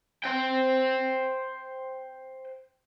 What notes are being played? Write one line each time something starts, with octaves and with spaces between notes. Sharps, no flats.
C5 G5